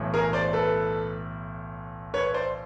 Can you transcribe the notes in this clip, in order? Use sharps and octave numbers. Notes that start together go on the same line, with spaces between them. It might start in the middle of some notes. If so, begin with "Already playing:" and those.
Already playing: B1 A2 E3
G#4 A#4
C5 D5
A4 B4
B4 C#5
C5 D5